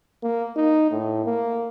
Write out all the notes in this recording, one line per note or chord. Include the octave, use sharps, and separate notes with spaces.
A#3
D#4
A2
A#3